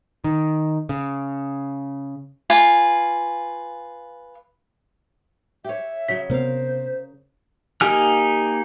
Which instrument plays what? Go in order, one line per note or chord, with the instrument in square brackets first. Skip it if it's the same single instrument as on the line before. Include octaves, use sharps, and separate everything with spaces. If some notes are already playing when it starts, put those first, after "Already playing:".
[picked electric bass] D#3
C#3
[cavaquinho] F4 B4 G#5
[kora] G4 C#5 [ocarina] E5
[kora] C#3 F#3 [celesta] B6
[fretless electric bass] C3 B3 C4 [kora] A#4 F5 [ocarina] C5
[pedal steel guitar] A#3 D#4 G4 G#5 F6